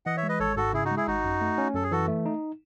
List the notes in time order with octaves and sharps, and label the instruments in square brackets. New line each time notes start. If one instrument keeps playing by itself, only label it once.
[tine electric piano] E3 [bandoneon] D#5 F#5
[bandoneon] C#5 E5
[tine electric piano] G#3
[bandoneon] B4 D#5
[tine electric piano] G#1 [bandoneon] A4 C#5
[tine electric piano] G#2 [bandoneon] F#4 A4
[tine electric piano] C#3 [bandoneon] E4 G#4
[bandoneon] D#4 F#4
[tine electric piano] G#3
[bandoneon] E4 G#4
[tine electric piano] G#1 [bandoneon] D#4 F#4
[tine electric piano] F#2
A3
C#4
[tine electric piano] F#2 [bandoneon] A4
[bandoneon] G#4
[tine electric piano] E3 [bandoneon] F#4 A4
[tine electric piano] A3
D#4